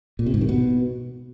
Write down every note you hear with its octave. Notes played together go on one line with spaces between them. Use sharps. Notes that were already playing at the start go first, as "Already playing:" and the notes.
A#2
C3
G#2
D#3
B2